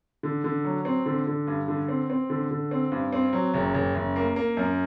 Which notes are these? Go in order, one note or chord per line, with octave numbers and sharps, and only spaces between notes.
D3
D3
F#3
C4
D3
D3
G2
D3
C4
C4
D3
D3
C4
G2
C4
F#3
F#1
F#1
F#1
A#3
A#3
F#2